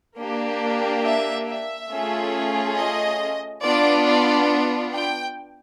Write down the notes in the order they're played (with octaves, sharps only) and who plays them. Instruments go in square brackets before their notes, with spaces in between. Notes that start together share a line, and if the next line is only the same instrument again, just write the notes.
[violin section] A#3 D4 G4
E5
E5
A3 C#4 F4 G#4
D#5
B3 D4 F4 D5
D5
G5